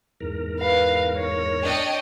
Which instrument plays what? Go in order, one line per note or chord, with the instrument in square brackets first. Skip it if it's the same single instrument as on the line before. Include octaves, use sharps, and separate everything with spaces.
[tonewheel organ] E2 G#2 A#4
[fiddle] B4 F5
C#5
[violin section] D4 D#5 G5